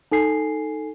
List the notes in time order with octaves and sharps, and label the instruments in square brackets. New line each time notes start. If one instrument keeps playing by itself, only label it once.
[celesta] D#4 A4 G#5 C7